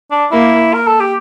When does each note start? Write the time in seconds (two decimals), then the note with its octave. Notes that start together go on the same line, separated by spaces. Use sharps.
0.11 D4
0.32 A#3 E4
0.74 A#4
0.87 A4
1.00 G4